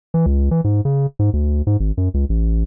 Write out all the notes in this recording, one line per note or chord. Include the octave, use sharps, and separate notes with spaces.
E3
C#2
E3
G#2
C#3
G#2
D2
G#2
G#1
F#2
C#2
A1